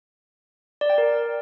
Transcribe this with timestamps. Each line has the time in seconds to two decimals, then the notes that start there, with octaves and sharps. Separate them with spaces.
0.81 D5
0.90 G5
0.98 A#4